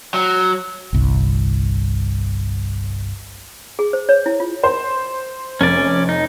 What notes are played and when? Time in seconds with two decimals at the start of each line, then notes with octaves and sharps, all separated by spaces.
0.14 F#3
0.93 G1 C2
3.79 G#4
3.93 C5
4.09 C#5
4.26 E4
4.40 F4
4.63 C5 C6
5.61 F1 C#4 D5
6.09 D#4